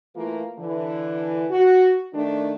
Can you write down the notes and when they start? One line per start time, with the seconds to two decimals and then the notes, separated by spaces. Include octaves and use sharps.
0.16 E3 A3 A#3 F4
0.59 D3 E3
1.51 F#4
2.14 D#3 A3 D4